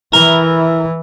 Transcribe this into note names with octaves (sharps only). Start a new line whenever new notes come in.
E3 E4 A#4